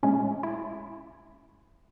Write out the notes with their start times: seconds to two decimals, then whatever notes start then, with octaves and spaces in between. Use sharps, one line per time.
0.03 A#2 G#3 C#4
0.43 E4